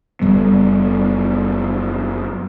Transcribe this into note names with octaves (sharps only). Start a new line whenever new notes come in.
F#1 G3 B3